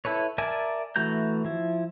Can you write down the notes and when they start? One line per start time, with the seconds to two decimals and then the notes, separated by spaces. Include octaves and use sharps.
0.05 E4 A4 B4 C#5
0.38 A#4 D5 E5 G#5 A5
0.96 E3 A3 F#4 A#5 G6
1.45 F3 E4